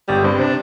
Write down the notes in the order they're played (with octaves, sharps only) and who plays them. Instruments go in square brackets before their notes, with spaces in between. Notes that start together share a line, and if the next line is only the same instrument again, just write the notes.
[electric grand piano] G1 [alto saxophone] G3
[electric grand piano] G2 [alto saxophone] C4
[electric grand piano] C3 [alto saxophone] D4